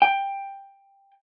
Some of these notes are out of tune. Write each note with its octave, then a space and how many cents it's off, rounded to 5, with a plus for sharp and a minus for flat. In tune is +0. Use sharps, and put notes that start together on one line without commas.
G5 +10